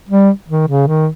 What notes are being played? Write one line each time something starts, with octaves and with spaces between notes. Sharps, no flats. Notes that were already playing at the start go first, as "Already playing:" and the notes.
G3
D#3
C#3
D#3